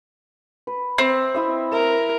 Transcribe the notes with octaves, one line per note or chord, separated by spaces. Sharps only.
B4
C4 E5
E4 D#5 E5
A#4 E5